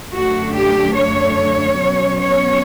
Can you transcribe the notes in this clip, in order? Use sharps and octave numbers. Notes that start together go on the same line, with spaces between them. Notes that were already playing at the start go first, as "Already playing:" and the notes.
F#2 D3 A3 D4 F#4
G4
C#5
B2 F#3 C#4
C#5